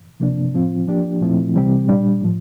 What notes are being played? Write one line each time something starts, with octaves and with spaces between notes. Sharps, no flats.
C3 F3 A#3 D4
A2 F3 C4 F4
F3 A#3 D4 G4
A#2 F3 A3 C4 E4
C3 E3 G3 C4 G4
A#2 G3 D4
A2 F3